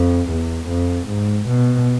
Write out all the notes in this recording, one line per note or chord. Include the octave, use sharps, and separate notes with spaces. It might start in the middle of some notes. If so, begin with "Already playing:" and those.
Already playing: F2
E2
F2
G#2
B2